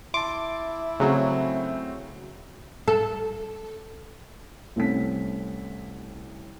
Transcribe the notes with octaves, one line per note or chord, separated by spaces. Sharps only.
E4 A5 C6 D6
C#3 F#3 A3 C4
A4
C2 A3 C4 C#4 B6